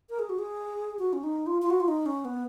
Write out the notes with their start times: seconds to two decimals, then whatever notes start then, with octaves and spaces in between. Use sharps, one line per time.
0.10 A#4
0.19 G#4
0.29 F#4
0.38 G#4
0.99 F#4
1.13 C#4
1.23 D#4
1.47 F4
1.62 F4
1.70 F#4
1.80 F4
1.88 D#4
2.06 C#4
2.25 B3